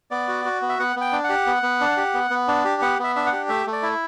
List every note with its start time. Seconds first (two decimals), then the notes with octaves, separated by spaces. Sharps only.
0.11 B3 D5
0.28 F#4
0.45 F#4
0.62 B3
0.69 E5
0.79 B3 F#5
0.96 B3 G5
1.12 D4
1.24 F#5
1.29 G4
1.46 B3
1.63 B3
1.81 D4
1.97 G4
2.14 B3
2.30 B3
2.48 D4
2.65 G4
2.82 B3 F#5
2.99 B3 E5
3.16 D4 E5
3.26 F#5
3.32 G4
3.49 A3 E5
3.67 A3
3.73 D5
3.83 E4